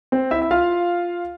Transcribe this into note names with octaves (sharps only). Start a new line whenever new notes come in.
C4 C5
E4 E5
E5
F4 F5